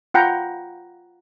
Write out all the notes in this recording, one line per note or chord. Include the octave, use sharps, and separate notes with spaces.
F4 F#5 G5 A#5 B5